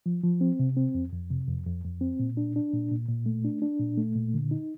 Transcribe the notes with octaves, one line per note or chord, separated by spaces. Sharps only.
F3
F3
C4
C3
C4
F2
F2
C3
F2
F2
F2
C4
A#2
D4
D4
A#2
A#2
A#2
A3
D4
D4
A#2
A3
A#2
D3
D#4